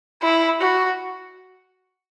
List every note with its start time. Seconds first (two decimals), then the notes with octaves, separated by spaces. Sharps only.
0.22 E4
0.60 F#4